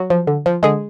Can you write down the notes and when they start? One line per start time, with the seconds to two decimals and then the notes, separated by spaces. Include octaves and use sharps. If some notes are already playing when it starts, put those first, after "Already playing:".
Already playing: F#3 F#4
0.10 F3
0.27 D3
0.46 F3
0.63 D3 G#3 G#4